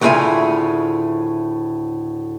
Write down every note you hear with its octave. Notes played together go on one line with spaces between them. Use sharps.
D2 A2 C#3 F4 E5 G#5